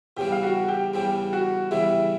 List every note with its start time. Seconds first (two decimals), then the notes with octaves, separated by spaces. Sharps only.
0.17 E2 C#3 E3 G3 G4 G5
0.32 F5
0.43 F#4 F#5
0.68 G4 G5
0.94 E2 C#3 E3 G3 G4 G5
1.33 F#4 F#5
1.71 E2 C#3 E3 G3 E4 E5